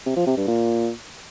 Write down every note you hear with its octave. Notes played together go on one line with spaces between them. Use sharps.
C3
F3
C3
G2
A#2